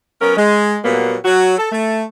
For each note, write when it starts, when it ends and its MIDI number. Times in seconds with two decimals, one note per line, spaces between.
0.22 0.34 54
0.22 0.34 59
0.22 0.34 61
0.22 0.34 70
0.37 0.78 56
0.85 1.18 46
0.85 1.18 54
0.85 1.18 55
0.85 1.18 58
0.85 1.18 59
1.25 1.54 54
1.25 1.54 66
1.58 1.68 69
1.72 2.03 57